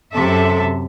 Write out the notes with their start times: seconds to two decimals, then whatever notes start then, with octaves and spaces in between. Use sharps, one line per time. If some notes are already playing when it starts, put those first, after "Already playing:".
0.12 F#2 C3 A4 E5